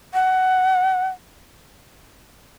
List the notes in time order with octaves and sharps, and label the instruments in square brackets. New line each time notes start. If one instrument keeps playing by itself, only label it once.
[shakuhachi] F#5